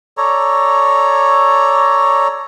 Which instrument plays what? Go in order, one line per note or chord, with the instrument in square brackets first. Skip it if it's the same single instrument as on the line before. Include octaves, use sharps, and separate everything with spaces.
[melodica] A4 C#5 D5 A#5